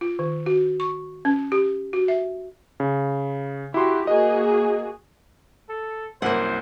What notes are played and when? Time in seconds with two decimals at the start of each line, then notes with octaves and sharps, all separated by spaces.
0.01 F4
0.19 D#3
0.46 F#4
0.80 C#6
1.25 C#4
1.52 G4
1.93 F#4
2.08 E5
2.80 C#3
3.74 E4 F#4 G4 C6
4.07 A#3 F#4 G#4 D#5
5.70 A4
6.22 C2 F#2 A#3 E4 C5 F#5